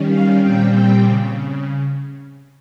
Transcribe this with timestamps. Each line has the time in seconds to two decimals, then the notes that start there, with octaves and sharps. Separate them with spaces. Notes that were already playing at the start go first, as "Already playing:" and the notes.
Already playing: D#3 G3 C#4
0.09 F5
0.42 A#2 G3 C4 G5
0.74 G5
1.06 C#3